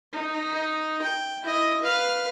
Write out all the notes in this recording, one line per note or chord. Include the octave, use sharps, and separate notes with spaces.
D#4
G5
E4 D#5
B4 F5